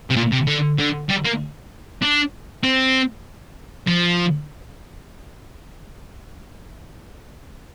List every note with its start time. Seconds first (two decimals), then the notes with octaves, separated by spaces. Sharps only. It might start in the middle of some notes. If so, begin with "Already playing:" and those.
0.10 C3
0.16 A#2
0.32 C3
0.47 D3
0.78 D3
1.09 G3
1.25 A#3
2.02 D4
2.63 C4
3.87 F3